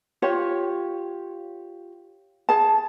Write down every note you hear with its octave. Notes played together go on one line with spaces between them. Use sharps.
F4 G4 C#5
G#4 A5